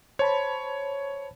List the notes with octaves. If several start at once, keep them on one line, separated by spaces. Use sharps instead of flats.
C5 C#5 A5 B5